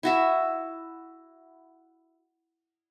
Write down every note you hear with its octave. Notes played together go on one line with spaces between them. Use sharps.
E4 F#4 E5